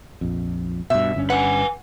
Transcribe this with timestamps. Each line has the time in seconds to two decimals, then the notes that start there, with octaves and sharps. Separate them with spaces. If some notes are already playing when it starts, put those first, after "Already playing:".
0.21 A#1 F2
0.90 G2 B2 E5
1.14 G1 G2 C#4
1.30 B4 F#5 G#5